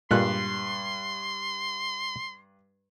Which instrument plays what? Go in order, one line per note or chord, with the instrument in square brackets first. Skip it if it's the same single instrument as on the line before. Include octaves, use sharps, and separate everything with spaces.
[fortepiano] G2 F#6 [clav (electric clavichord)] A#2 G#3 F4 [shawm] C6